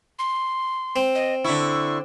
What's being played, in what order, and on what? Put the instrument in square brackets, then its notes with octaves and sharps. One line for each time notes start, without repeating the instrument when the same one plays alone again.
[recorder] C6
[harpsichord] C4
[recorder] D#5
[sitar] D3 E4 [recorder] C#6